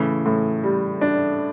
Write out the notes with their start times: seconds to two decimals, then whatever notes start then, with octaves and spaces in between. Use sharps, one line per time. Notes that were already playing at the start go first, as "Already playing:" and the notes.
Already playing: A2 C#3 E3
0.26 A2
0.64 G3
1.01 D4